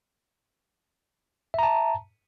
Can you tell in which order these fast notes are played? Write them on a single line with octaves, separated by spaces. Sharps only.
E5 A#5 A5